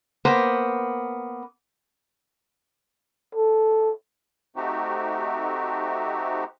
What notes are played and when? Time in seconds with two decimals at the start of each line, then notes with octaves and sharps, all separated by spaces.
0.25 A#3 B3 C5
3.35 A4
4.56 A3 C4 D#4 F#4 G4